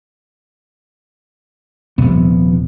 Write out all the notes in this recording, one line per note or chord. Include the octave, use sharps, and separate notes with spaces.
D#1 C3 F3 B3